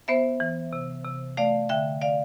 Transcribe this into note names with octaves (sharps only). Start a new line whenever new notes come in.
B3 C5 E5
E3
C3
C3
A3 D5 F5
D3 E5 G5
D5 F5